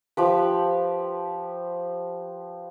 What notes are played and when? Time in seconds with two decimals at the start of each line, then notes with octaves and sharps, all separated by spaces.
0.17 F3 G4 B4